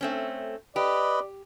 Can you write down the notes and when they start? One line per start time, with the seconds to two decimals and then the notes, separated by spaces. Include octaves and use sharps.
0.01 A3 C4 C#4
0.76 G4 B4 D5 D#5